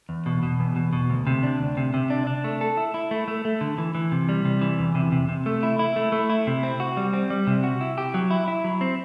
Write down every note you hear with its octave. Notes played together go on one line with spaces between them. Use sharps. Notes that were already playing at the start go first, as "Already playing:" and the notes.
E2
B2
B2
E2
B2
B2
D2
C3
D4
D2
C3
C3
D4
D4
A3
A4
E4
E4
A3
A3
A3
D3
E3
E3
C3
G3
C3
E3
E2
C3
C3
C3
A3
E4
E4
A3
A3
E4
C3
C4
F#4
G3
C4
G3
C3
F#4
E4
G4
F#3
E4
E4
F#3
C4